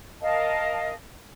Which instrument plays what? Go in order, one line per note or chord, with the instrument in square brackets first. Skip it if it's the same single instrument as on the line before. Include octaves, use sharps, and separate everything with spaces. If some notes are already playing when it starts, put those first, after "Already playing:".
[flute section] A#4 D#5 F5 A5